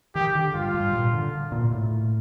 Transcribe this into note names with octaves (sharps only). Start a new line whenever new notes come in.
D#3 G4
D3
G2 F4
G2
A#2
D3
A#2
A2